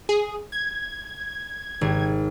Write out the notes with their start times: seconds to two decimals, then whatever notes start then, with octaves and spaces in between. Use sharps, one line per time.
0.09 G#4
0.52 G#6
1.81 G#1